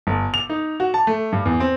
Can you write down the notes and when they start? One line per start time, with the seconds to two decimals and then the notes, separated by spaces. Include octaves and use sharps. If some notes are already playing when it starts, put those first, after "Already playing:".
0.07 G1
0.34 F7
0.50 D#4
0.80 F#4
0.94 A5
1.07 A3
1.32 G2
1.45 E2
1.60 C4